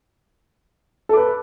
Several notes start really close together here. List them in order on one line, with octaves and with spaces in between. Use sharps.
A4 D6 B4